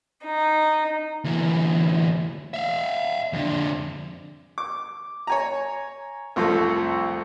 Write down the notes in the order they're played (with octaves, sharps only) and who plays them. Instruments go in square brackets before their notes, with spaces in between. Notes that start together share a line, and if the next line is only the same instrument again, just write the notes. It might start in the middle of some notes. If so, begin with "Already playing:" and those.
[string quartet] D#4
[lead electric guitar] D2 E3
E5 F5
F2 D3
[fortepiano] D6
C#5 G#5 A#5
C2 F2 F3 A3 A4